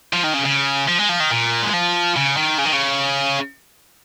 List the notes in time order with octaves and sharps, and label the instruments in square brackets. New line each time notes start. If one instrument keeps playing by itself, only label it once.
[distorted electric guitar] F3
D#3
C#3
C#3
F3
G#3
F3
D#3
A#2
G#3
F3
C#3
D#3
C#3
D#3
C#3